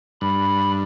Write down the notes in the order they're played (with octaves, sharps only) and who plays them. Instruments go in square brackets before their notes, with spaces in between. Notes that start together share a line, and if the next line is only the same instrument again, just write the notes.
[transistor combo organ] G2 [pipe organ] B5